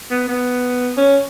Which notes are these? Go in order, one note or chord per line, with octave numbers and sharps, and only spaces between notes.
B3
B3
C#4